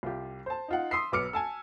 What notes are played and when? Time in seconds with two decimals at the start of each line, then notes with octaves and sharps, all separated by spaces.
0.03 C2 F4 G4
0.46 C5 A5
0.68 D#4 F4 F#5
0.91 C6 D#6 E6 B6 C7
1.12 B1 B3 D6 F6 C#7
1.33 G#5 A5 E6